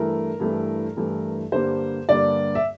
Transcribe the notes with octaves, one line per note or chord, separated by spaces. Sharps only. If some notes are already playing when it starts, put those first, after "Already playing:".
Already playing: G2 E3 A3 E4 A#4
G2 E3 A3 E4
G2 E3 A3 E4
G2 D3 G3 A#3 C5
G2 D3 G3 A#3 D5
E5